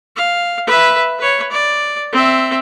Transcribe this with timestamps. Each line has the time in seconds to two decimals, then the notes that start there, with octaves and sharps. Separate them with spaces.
0.16 F5
0.67 B4 E5
1.19 B4 C#5
1.51 D5
2.12 C4 E5